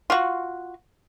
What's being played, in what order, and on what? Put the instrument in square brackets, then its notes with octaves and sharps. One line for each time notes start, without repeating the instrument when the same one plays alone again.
[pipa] F4 F#4